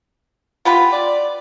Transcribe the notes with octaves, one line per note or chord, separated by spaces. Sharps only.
B3 F4 G4 B4
D5